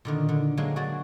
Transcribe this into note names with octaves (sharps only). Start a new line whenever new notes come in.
A#2 D3 D#3
D3
D3 F#3 G#3 A#3 D4
F#3 F#4 G#4 D5